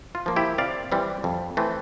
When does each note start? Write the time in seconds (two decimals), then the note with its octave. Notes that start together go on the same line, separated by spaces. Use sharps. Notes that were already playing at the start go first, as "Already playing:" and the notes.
0.15 F4
0.26 F3 A#3
0.36 E4 G4
0.58 C3 D5 F5
0.92 E3 G3 C4
1.24 F2
1.57 E3 A3 C4